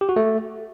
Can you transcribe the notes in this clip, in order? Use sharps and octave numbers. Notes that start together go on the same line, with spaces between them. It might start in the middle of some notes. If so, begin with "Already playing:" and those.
G4
F#4
A3